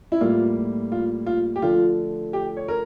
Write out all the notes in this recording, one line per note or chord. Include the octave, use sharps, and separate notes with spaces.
E4
A2 G3 A#3 F4
F4
F4
G4
D3 F3 A3 F4
G4
C#5
A#4